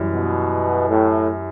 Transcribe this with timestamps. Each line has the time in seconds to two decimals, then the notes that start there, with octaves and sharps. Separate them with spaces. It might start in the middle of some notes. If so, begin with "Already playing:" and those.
Already playing: F#2 E3 G3
0.13 B2
0.89 A2